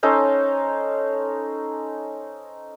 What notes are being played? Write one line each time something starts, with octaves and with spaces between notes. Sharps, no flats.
C#4 D#4 A4 C5